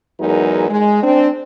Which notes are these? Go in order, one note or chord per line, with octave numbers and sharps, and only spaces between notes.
E2 F#3 G#3 D#4 A#4
G#3
C4 D4